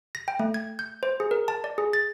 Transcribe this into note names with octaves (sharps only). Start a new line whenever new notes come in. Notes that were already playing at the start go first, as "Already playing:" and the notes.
A#6
G5
A3
G#6
G6
C5
G#4
A#4
A5
D5
G#4
A6